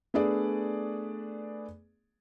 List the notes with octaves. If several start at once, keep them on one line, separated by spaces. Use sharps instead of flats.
A3 B3 D4 G#4 D5